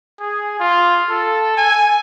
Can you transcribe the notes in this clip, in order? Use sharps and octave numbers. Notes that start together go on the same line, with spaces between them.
G#4
F4
A4
G#5